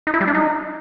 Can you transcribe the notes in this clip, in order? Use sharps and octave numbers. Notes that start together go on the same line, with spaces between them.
D#4
E4
G3
D4
D#4